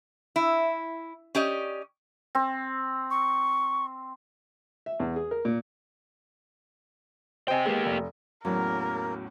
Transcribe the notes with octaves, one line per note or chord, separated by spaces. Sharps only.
E4
C#4 G4 D5 D#5
C4
C#6
E5
E2
G#4
A#4
A#2
C3 C5 D#5 G5 G#5
G#3 A#3 B3 G4
F1
E2 A2 F#3 A#3 C#4 A#4